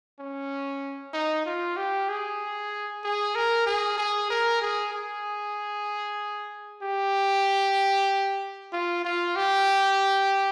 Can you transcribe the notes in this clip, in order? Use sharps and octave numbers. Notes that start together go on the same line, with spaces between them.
C#4
D#4
F4
G4
G#4
G#4
A#4
G#4
G#4
A#4
G#4
G#4
G4
F4
F4
G4